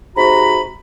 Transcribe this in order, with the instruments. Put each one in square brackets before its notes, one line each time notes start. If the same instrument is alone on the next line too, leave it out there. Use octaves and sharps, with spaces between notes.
[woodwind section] G#2 C3 F#4 A#5 B5